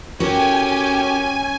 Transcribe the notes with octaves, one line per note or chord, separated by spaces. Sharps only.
C#4 F#4 G4 A4 A#4 G5 G#5